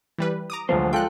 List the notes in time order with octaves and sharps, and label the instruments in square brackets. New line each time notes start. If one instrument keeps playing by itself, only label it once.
[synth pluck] E3 G3 B4
A#5 D6 D#6
[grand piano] D2 F3 [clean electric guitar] F#3 G#3 C5
[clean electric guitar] F3 G#3 [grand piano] F4 A4 G5 [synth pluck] F#6 G6